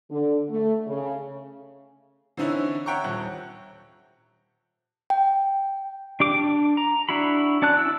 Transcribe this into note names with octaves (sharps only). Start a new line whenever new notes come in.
D3
A3
C#3
D3 E3 C4 C#4 D#4 E4
C#5 E5 F#5 G5 A#5 C#6
D#1 F#6
G5
D4 G4 D6
D4
A#5
D4 E4 F#4 B5
C#4 D5 A5 F#6
D4 E4 E6